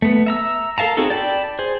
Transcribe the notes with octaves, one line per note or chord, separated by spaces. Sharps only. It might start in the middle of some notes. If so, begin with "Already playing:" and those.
A3 B3
E5 A#5 E6
A4 A#4 F5 A5 A#5
C4 D#4 F#4 G#4 A4
D5 G5 A5 B5
G#4 C5